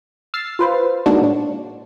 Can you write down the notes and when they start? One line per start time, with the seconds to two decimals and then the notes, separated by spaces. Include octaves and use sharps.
0.34 E6 F6 A6 C7
0.59 F4 B4 C5
1.06 G#3 A#3 D4 D#4 F#4
1.21 A2 D4